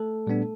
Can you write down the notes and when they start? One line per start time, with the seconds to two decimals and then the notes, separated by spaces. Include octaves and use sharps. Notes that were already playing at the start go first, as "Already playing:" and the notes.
Already playing: A3 A4
0.27 A#2 G3 B3 D4